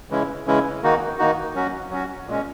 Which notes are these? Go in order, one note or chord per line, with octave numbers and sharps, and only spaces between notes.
C#3 E3 G#3 C#4 E4
C#3 E3 G#3 C#4 E4
D#3 A#3 D#4 F#4
D#3 A#3 D#4 F#4
F#3 C#4 F#4
F#3 C#4 F#4
A#2 G#3 C#4